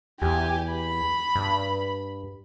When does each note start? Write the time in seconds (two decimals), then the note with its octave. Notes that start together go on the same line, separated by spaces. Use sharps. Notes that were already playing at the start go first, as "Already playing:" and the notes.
0.22 E2 G4 G#5
0.73 B5
1.35 G2